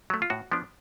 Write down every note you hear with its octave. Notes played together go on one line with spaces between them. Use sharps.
F#3 A3
F4
A2 F#4
F3 B3 D4